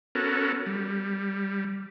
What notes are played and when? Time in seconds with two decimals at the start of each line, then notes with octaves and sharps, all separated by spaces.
0.15 B3 C#4 F#4 A4 A#4
0.66 G3